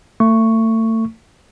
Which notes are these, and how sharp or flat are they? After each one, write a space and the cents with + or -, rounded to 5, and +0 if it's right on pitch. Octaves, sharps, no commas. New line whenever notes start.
A3 +30 C#6 +0